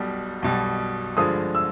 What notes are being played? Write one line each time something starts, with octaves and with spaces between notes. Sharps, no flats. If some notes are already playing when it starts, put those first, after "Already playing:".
Already playing: B1 B2 G3
B1 B2 G3
G2 D3 F3 G#3 D#6
E6